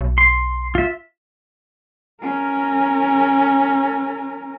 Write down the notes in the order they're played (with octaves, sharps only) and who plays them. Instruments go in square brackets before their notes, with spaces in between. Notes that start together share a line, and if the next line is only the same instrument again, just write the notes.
[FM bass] B1
[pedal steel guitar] C6
F4 E5
[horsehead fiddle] C#4 A#4